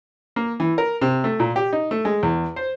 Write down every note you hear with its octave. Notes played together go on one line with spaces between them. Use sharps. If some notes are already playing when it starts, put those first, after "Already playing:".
A#3
E3
A#4
C3
A3
A#2
G4
D#4
A3
G#3
E2
C5